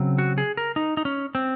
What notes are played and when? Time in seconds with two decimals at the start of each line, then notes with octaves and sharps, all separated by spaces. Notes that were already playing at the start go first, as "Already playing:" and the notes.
Already playing: C#3 F#3 C4
0.18 F#4
0.38 G#4
0.57 A#4
0.76 D#4
0.97 D#4
1.05 C#4
1.35 C4